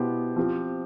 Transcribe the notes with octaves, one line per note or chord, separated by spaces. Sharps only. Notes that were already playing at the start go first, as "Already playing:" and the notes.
Already playing: B2 B3 E4 G4 C5
F3 C4 G4